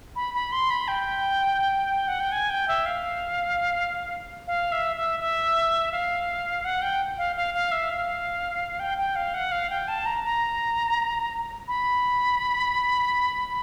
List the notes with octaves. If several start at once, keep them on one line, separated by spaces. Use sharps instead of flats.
B5
B5
C6
B5
G5
F#5
G5
G#5
G5
E5
F5
F5
E5
E5
E5
F5
F#5
G5
F5
F5
F5
E5
F5
G5
G5
F5
F#5
F5
G5
A5
A#5
A#5
B5